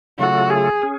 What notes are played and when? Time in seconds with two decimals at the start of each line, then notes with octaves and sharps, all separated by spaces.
0.19 C#3 F#3 A3 F4 F#4 A4
0.50 G#4
0.82 C#4 G#4